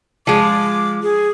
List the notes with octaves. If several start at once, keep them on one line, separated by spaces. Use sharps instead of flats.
F3 G#3 D6
G#4